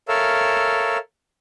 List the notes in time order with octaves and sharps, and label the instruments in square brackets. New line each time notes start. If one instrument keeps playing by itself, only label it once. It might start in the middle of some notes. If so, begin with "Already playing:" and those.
[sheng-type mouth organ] A4 A#4 C#5 E5 F5 E6